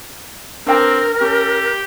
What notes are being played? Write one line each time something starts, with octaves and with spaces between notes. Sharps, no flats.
C4 D4 A#4 B4 G5
C#4 G4